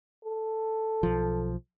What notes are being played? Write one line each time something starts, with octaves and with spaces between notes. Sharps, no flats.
A4
B1 F3